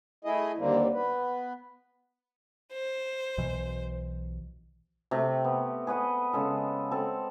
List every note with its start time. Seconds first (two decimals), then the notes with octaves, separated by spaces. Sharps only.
0.25 A3 E4 G#4 D#5
0.58 D#2 D3 G3 A#3 C4
0.94 B3 B4
2.72 C5
3.38 B1 B2 E3
5.11 C3 A3 G4
5.44 B3
5.87 G#4 B4 D#5 F#5
6.33 C#3 G#3 A4
6.92 C4 A4